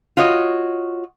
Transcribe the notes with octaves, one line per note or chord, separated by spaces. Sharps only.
F4 F#4 C#5 D#5